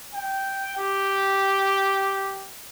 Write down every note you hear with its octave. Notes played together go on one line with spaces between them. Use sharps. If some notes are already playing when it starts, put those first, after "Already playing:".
G5
G4